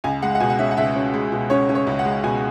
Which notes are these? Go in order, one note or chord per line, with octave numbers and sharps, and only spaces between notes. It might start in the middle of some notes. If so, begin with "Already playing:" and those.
C#2 G#5
G#3 F#5
F#5
B2 G#5
F#5
C#4 E5
F#5
C#2 E5
C#4
G#3
B2
C#4 C#5
C#4
C#5
C#2
F#5
G#3
B2 G#5